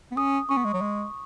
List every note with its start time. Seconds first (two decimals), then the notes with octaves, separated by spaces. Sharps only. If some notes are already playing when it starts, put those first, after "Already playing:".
0.12 B3
0.16 C#4 D#6
0.49 C#4 C#6
0.57 B3
0.65 G#3
0.74 F#3
0.81 G#3